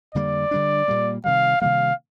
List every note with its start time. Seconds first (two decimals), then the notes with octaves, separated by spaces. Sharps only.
0.14 F2 D3 G3 A#3 D5
0.51 D3 G3 D4
0.88 A#2 G3 A#3
1.24 C3 D#3 G3 F5
1.61 C3 D#3 G3 A#3 F5